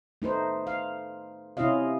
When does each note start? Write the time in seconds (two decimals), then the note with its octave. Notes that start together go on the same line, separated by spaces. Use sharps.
0.22 A3 D#4 B4 C5
0.67 F5
1.57 C3 C#4 E4 F4 D#5 F5